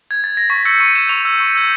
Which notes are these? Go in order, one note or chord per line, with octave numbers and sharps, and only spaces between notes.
G#6
A6
A#6
C#6 B6
E6 G6 C#7
C#6 D#7
E6 G6 E7
C#6 F7
E6 G6
C#6
E6 G6